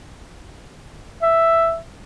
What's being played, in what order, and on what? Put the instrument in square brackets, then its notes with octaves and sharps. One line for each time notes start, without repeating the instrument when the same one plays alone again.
[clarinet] E5